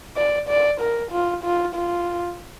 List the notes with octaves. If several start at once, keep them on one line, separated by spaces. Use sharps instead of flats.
D5
D5
A#4
F4
F4
F4